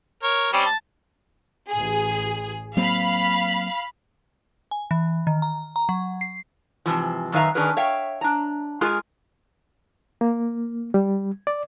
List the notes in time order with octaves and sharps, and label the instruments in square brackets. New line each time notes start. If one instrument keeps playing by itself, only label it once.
[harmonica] A#4 C#5
G3 C4 C#4
A5
[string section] A1 G#4
[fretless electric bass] F#3 A#3 C4 [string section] F5 B5
[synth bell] G#5
E3
D#3
A#5
A#5
F#3
C7
[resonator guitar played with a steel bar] G#2 C3 E3 F3
F#2 D#3 B4 E5 F5 A#5
D#3 C#4 D4 G#4 A#4 B4
C#5 E5 F5 G5
D4 A#5
G#3 F4 G#4 A#4
[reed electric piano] A#3
G3
D5